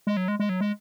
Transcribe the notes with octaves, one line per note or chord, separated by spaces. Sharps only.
G#3
F#3
G#3
G#3
F#3
G#3